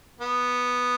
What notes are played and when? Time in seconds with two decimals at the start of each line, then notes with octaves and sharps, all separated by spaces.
0.21 B3